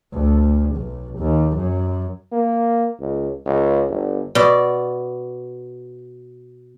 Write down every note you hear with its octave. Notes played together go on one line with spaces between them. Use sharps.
D2
B1
D#2
F#2
A#3
C#2
C#2
G1
B2 D5